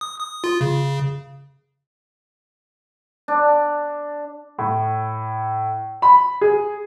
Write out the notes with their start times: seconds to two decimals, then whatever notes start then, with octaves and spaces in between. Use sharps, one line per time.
0.01 D#6
0.20 D#6
0.44 F4
0.61 C#3
3.28 D4
4.59 A2
6.02 B5
6.41 G#4